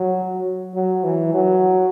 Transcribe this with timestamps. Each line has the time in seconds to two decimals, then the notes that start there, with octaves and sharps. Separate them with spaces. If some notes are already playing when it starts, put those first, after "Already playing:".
Already playing: F#3
0.75 F#3
1.04 E3
1.34 F#3